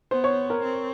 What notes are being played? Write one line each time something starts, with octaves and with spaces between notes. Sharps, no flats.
B3 C5
C#5
A#4
C4